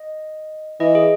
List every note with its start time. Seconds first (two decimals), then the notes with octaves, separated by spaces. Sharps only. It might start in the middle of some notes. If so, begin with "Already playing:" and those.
Already playing: D#5
0.80 E3 D#5
0.95 G#4